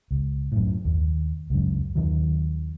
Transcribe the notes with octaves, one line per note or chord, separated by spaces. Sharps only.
C#2
F#2 A2
D#2
C#2 F#2
D#2 D#3 F#3